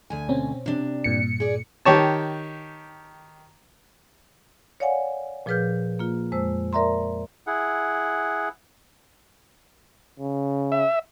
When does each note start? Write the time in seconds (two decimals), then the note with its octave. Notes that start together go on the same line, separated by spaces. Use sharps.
0.10 D2 G#5
0.28 B2 C4 C#4
0.66 C3 D4
1.04 G2 A#2 C#7
1.40 G#4 D5
1.85 D#3 G4 C#5 A5
4.80 C#5 D5 F5 F#5 G#5
5.46 A#2 F3 G#4 B4 F6 G6
5.99 A#3 F4
6.32 F2 G#3 C5 E6
6.73 A#4 D5 E5 A#5 C6
7.47 E4 G#4 F#5
10.20 C#3
10.72 E5